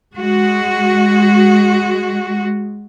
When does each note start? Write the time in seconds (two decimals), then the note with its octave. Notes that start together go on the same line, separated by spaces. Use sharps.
0.16 G#3 F#4